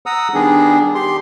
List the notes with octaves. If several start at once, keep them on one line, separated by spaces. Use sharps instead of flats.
F#5 A#5 D#6 E6
D#3 G3 B3 D4 G#4
G4 C6